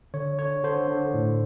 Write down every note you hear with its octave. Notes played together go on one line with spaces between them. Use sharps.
D3 C#5
D3 C#5
D3 C5
D3
A2